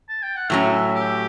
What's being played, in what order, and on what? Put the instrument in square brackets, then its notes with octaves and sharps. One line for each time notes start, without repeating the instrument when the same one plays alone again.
[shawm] A5
G5
F#5
[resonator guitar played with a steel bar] A2 F#3 C#4 [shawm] E5
[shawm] G4